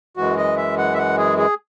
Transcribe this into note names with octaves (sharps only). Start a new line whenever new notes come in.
F#2 E3 G#3 F#4
D#5
E5
F#5
E5
F#5
G#4
G#4